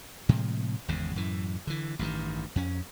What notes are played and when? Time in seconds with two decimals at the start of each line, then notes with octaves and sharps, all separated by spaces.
0.29 A2 C3 F3 G#3
0.88 G#1 E2 G#2 C#3
1.16 F#2 A2 E3
1.67 D3 E3
1.99 A1 G2 D3 D#3
2.56 F2 C#4